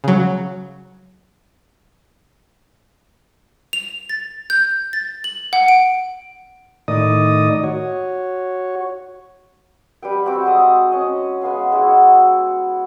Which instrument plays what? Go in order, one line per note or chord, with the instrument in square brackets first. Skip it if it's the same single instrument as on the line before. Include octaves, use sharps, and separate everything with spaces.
[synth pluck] C#3 F#3
[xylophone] F7
A6
G6
A6
F#7
F#5
D7
[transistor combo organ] A2 D#3 D5 D#5 D#6
F#4 C#5
[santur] G3 B4 G5
C4 F#4 E5 D6
G#3 A5 D#6
C#4 D#5
G#3 B3 F5 G#5
G#3 E4 F#4